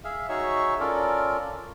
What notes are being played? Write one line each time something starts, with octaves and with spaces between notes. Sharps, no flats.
G#4 E5 F5
D#4 F#4 G#4 C#5 E5 C#6
C#4 F4 A4 A#4 D5